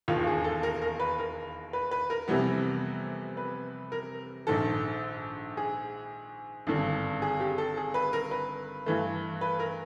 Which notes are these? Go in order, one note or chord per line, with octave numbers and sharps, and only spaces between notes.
E1 D#2 D#3 F4
G#4
A4
A#4
A#4
B4
A#4
B4
B4
A#4
F2 C3 E3 G3 B3
B4
A#4
A#1 G#2 D#3 A4
G#4
G#1 G2 D3
G#4
G4
A4
G#4
B4
A#4
B4
G2 E3 A3
B4
A#4